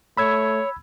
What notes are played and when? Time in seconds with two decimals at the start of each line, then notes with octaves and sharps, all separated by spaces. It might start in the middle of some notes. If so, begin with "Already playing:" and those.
0.17 A3 C#5 B5 E6 G#6